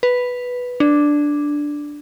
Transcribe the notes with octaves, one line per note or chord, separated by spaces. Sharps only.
B4
D4